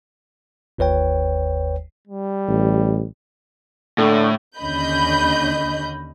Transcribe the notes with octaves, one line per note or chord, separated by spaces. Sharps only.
G1 D#2 B4 C#5 G5
G3
A1
A2 D3
D#2 D3 C#4 D#5 B5 G6